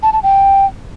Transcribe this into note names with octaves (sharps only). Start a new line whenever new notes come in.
A5
A5
G5